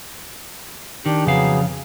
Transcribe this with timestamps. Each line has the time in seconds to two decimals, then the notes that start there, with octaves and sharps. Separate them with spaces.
1.06 D#3 D4 G4
1.26 F2 C#3 F#3 B3 G#4 F5